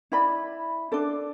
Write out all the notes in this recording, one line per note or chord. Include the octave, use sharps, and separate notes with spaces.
E4 D5 B5
D4 A4 D5